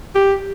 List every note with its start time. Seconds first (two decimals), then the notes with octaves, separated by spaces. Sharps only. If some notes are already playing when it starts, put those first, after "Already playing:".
0.15 G4